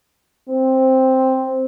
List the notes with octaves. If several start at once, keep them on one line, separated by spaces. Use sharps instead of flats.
C4